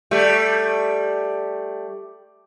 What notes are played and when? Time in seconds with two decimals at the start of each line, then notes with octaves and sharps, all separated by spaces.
0.11 G3 A3